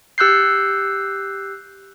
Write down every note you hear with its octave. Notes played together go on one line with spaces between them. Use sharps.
G4 E6 F#6 G6 C7